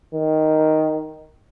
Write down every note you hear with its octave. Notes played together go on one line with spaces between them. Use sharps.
D#3